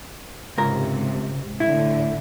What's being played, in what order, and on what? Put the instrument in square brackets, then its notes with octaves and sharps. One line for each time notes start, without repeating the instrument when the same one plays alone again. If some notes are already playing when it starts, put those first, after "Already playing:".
[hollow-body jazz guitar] C#2 A#4 [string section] G#2 C3
[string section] A2 D3 [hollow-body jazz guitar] E4